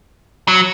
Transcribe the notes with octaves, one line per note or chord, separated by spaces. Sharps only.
F#3